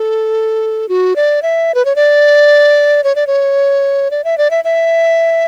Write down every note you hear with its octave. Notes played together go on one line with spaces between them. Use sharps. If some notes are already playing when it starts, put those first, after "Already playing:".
Already playing: A4
F#4
D5
E5
B4
C#5
D5
C#5
D5
C#5
D5
E5
D5
E5
E5